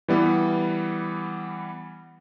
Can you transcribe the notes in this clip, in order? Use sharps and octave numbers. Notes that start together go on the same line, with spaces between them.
E3 G3 B3